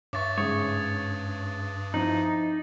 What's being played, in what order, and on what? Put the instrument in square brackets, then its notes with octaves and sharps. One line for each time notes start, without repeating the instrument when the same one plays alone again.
[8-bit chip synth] G2 [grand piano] C#5 E5 C#6 [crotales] D6 A6
[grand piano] G#2 C#3 E5 [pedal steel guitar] C#5 [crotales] D#6
[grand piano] F3 C4 E4 [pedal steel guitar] D#4 [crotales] F#7